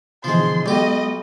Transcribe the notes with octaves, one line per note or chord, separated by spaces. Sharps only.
B2 D3 E3 F3 G#3 C6
B1 G#3 B3 G4 D#5